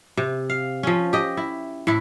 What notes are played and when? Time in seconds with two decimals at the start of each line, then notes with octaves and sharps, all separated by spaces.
0.17 C3
0.50 F5
0.83 F3 C#4
1.13 G4 D#5
1.37 E4
1.87 A2 E4